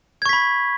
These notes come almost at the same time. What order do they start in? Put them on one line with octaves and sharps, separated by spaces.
G#6 C#6 B6 B5